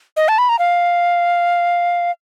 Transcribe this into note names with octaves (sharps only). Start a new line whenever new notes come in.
D#5
A5
B5
A#5
F5